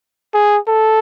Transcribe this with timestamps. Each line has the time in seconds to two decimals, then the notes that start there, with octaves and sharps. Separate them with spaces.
0.34 G#4
0.69 A4